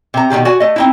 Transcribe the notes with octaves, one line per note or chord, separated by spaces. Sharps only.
C3 A#5
B2 D#3 F#3 G4
F#4 D5 G#5
A3 D#5
C4 D#4 E4